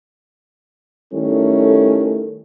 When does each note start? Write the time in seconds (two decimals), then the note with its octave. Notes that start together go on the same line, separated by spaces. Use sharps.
1.13 D#3 G3 A3 C#4 E4 A4